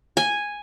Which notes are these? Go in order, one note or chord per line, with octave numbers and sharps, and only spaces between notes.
G#5